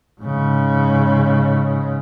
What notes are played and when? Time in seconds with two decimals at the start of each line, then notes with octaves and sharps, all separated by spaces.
0.21 G#2 C#3